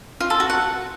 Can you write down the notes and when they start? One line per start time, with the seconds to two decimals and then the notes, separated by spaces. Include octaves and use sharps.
0.20 F4
0.30 A4
0.40 F#4
0.50 F#5